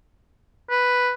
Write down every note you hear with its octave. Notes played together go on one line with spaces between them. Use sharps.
B4